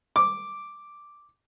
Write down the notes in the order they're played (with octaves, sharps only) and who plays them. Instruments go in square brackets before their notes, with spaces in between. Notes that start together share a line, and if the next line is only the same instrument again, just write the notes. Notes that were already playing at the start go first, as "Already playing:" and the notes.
[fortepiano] D6